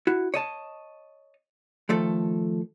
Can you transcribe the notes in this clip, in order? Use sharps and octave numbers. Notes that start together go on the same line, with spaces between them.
E4 F#4
C#5 D#5 A5
D#3 F3 A3 A4